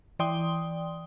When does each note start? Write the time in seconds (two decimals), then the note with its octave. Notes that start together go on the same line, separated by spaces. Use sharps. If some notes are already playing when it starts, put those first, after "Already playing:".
0.19 E3 D5 G5 C6 D#6 G7